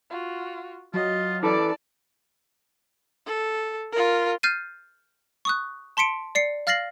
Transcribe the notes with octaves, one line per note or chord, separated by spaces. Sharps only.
F4 F#4
F#3 F4 D#5
E3 A4 D5 A5 D6
A4
F4 A#4
F6 G6 A6 C7 D#7
C#6 D#6 F#6
A5 C6 B6 C#7 D7
D5 C7 C#7
F5 F6 A6 A#6 C7 F#7